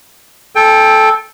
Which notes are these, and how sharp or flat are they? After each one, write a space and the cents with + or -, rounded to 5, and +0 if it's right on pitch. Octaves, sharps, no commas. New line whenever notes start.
A4 -10 G5 +20